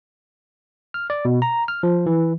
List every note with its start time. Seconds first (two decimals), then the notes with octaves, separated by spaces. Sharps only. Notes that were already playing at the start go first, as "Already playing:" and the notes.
0.94 F6
1.10 D5
1.25 B2
1.42 A#5
1.68 F6
1.83 F3
2.06 E3